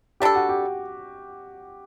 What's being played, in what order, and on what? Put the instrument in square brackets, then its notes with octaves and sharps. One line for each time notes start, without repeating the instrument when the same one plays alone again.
[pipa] G3 D4 A4 [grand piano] G4
[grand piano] F#4
G4